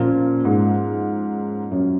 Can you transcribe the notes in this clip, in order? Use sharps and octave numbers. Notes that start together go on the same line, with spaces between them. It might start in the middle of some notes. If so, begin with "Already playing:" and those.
Already playing: A#2 F3 A#3 C#4 F4
G#2
F#2